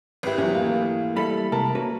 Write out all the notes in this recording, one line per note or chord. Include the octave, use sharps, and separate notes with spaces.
G#1 E4 G4 B4
E2 F#3 C#4
E3 A3 A#3 F5
G3 A4 E5 B5
C3 G#3 A#4 A5
A#3 C#4 F#4 B4